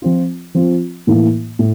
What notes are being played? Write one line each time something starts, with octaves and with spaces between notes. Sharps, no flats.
F3 C4 F4
F3 C4 F4
A2 E3 A#3 E4
A2